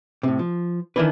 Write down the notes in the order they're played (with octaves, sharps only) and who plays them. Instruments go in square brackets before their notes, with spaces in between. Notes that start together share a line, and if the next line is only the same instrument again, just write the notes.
[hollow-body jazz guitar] A2 C3
F3
[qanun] D#3 E3 D4 [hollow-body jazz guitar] B4 D5